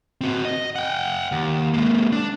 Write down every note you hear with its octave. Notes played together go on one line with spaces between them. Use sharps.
C4 F#4
D#5
F#5 G5
D#2
G#3 A#3
D4